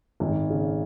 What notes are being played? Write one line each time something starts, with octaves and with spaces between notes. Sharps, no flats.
G#1
C#3